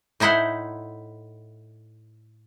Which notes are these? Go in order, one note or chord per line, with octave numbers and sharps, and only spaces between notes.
A2 D#4 E4 C5 F#5